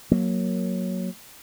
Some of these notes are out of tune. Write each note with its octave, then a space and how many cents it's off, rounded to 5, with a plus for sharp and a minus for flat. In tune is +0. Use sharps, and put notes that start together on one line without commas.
F#3 -5 A#3 +0